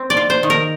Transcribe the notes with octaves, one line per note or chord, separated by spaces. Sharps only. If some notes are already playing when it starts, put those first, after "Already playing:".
Already playing: C4
D5
F4
C5
D#3
A#4